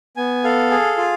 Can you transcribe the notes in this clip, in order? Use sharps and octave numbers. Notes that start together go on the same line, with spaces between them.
B3 G#5
A4 F5
G#4
F4